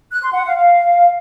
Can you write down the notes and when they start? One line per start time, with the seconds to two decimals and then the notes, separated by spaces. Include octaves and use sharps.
0.12 F#6
0.23 C6
0.34 F#5
0.45 F5
0.56 F5